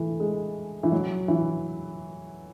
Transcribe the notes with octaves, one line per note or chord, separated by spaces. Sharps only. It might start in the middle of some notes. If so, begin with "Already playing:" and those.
Already playing: E3 A3
G#3
E3
F#3
E3